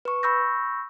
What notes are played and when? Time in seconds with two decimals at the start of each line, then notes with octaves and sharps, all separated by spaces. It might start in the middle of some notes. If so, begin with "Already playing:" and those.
0.05 B4 C#6
0.23 B5 C#6 E6 G6 A#6